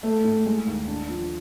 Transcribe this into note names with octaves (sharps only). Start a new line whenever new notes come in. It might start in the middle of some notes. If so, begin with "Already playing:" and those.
A3
A2
G#3
D#2
D4
F3